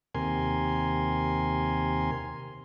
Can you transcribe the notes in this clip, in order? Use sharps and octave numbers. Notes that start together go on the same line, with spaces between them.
D#2 C3 A#4 G#5 C6